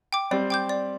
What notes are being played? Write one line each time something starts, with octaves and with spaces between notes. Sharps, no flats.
G5 D6
G3 C4 D5
G5 D6 G6
D5